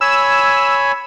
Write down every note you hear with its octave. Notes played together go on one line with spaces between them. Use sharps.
C#5 G#5 B5 E6